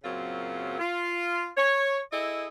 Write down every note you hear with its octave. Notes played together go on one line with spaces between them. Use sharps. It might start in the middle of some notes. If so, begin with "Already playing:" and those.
F#2 A#2 C#3 F#3 C4 F4
F4
C#5
E4 G#4 A4 D#5